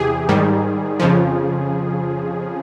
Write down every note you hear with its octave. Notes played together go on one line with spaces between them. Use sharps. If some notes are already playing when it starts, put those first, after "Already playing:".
Already playing: E2 C3 E3 G4 G#4
G#2 D#3 G3
F2 C#3 F3